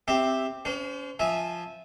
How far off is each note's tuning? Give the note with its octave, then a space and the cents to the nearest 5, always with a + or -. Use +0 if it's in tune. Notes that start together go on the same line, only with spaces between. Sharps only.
C4 +0 G4 +5 E5 +0
C#4 +35 C5 -25
F3 +0 E5 -15 G#5 +0